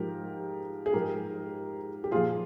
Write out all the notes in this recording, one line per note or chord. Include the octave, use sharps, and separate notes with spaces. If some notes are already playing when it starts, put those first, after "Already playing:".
Already playing: G#2 F3 G4 A#4
G#4
G#2 F3 G4 A#4
G4
A#2 F3 F4 G#4